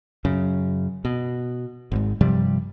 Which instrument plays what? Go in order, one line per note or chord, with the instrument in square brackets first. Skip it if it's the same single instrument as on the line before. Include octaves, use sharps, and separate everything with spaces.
[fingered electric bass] F#2 C#3
B2
G#1 G#2
G2 C3 F3 G3